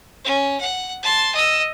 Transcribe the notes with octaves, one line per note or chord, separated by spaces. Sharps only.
C#4
F#5
A5 C6
D#5 E6